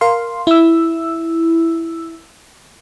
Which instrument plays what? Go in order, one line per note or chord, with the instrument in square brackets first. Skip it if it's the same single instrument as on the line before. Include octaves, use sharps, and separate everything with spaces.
[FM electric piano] A#4 F5 C6
E4 E6